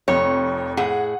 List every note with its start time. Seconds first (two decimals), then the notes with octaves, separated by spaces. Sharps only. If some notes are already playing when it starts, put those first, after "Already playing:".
0.08 F1 F2 C#5
0.77 A2 G#4 F#5